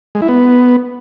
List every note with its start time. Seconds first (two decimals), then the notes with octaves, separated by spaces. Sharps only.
0.15 G#3
0.22 E4
0.28 B3